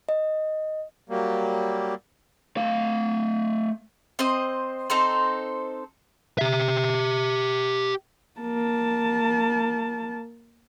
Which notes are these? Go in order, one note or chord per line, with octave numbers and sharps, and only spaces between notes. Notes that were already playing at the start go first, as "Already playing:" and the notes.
D#5
F#3 G3 A#3
A3 F5
C4 C5 D#5
C4 D#4 A4 C5
G4 E5
A#3 A5